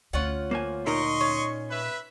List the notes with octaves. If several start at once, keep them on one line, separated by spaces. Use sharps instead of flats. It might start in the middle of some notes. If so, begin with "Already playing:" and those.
D2 C#4 F4 F#5
A#3 C5 G#5
A#2 D#4 A#4 D#5 C6 C#6
C#4
B4 E5